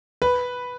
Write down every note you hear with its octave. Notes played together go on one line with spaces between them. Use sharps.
B4